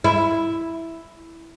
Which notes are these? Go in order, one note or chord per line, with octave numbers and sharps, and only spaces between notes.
E4